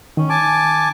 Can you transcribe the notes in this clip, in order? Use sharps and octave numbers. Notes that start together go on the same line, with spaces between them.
D#3 C#4
G#5 A5 D6